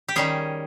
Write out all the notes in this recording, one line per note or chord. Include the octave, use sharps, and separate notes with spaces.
G4
D#3 G3 C#4 G#4